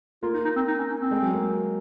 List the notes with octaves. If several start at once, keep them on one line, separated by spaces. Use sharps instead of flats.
A#3 F4
D#4
D#4
C4
D#4
C#4
C#4
C4
G#3
F#3
A#3